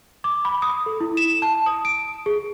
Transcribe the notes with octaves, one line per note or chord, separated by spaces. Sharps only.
D6
B5
D#6
A4
E4
E7
A5
D#6
D7
G#4